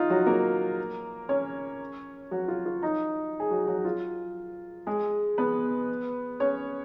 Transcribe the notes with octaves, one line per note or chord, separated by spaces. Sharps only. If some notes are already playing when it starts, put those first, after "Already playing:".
Already playing: D#4 F4
F#3 F#4
A#3 A#4
C#4 C#5
F#3 F#4
F4
F4
D#4
G#4
F#3 F#4
F#3 F#4
F4
G#3 G#4
B3 B4
C#4 C#5